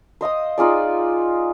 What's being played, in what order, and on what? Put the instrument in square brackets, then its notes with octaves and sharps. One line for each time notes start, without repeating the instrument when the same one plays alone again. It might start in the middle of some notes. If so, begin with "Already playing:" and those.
[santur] C5 D#5 F5 D#6
D#4 F4 G#4 D5